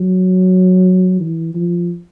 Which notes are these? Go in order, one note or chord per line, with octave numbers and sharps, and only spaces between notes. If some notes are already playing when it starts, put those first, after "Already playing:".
Already playing: F#3
E3
F3